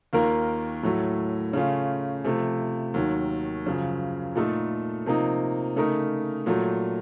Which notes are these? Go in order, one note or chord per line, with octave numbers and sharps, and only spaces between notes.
D#2 D#3 A#3 F4 A#4
A2 F#3 A3
C#3 A3 C#4 F4
C3 F3 A3
D#2 D#3 F#3
F#2 C#3 F3
A#2 A3 D#4 A4
C3 F3 A#3 D#4
C#3 A3 D#4 A#4
A#2 F#3 A3